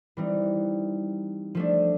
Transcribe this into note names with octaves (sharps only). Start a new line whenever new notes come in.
E3 G3 C4 D#4
F3 A3 D4